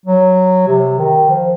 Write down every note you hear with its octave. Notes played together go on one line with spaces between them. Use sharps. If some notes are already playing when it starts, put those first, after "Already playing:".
F#3
C3
D#3
F3